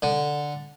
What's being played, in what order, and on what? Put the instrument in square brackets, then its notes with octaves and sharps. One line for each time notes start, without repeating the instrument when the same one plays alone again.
[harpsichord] D3